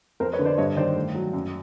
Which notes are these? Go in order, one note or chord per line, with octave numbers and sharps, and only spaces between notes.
F2 A#4 C5
B4 C#5
D3
C5 D5
G2 C#5 D#5
D#3 C5 D5
A2
F#3
F#2